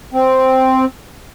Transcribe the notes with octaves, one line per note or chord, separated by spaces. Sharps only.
C4